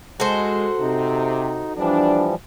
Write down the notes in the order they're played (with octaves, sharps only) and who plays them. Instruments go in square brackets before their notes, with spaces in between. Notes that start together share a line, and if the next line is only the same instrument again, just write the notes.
[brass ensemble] G#3 [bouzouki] F#4 A4 C5
[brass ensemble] C3 [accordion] D#4
[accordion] E3 F3 G3 [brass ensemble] D4